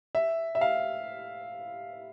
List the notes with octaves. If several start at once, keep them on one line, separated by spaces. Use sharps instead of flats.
E5
E5
F5